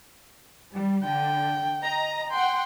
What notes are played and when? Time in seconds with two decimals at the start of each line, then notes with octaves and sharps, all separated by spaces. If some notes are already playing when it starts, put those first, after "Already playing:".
0.73 G3
1.03 D3 G5
1.81 D#5 A#5
2.31 F#5 G5 C6